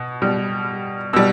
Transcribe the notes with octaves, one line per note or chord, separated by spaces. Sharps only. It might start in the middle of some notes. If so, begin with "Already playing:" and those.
Already playing: B2
B2 G3
B2 G3 E6